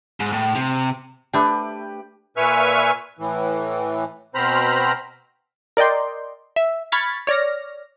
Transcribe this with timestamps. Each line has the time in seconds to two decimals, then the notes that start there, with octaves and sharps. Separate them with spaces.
0.20 G#2
0.33 A2
0.55 C3
1.33 A3 D4 G4 B4
2.37 A#2 B4 E5 G#5 C#6 F6
3.19 A2 E3
4.35 B2 C4 C5 A#5 B5 F6
5.77 A#4 D5 D#5 G5 C6
6.56 E5
6.92 B5 C#6 F6 G#6 A6 B6
7.27 C#5 D5 F6 A#6